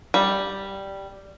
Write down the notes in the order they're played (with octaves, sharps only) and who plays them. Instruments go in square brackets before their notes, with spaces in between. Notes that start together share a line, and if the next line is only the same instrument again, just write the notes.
[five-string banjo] G3